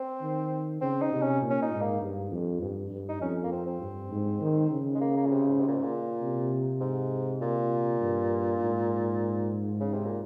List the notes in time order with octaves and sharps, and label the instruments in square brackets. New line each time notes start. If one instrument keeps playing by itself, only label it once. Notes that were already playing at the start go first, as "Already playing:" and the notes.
Already playing: [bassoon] C4
[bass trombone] D#3
[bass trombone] C#3 [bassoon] C4
[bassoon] D#4
[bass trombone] C3
[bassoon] C#4
[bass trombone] A#2
[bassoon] C#4
D#4
[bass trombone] G#2
[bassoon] A#3
[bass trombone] G2
F2
G2
G2
[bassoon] D#4
[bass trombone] F2 [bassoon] C#4
[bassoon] A#3
C4
C4
[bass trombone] G2
G#2
D#3
C#3
[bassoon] G#3
A#3
A#3
A#2
C3
G#2
C3
A#2
G#2
A#2
[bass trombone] C3
[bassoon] G#2
A#2
[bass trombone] G2
G#2
[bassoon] C#3
C3
A#2